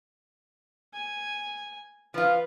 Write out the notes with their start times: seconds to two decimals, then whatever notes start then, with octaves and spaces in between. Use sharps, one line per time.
0.94 G#5
2.14 F3 F4 B4